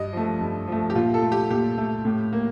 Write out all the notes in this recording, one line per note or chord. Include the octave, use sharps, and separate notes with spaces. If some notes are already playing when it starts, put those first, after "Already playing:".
Already playing: G2 D#5
F3 A3
G2
F3 A3
G4
A#2 F4
A4
A3
G4
A#2 G4
A3
A2
A#3